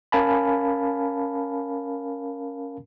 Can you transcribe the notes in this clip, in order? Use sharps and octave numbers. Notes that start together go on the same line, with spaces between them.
C#4 A#4 F5 G#5 A5 B5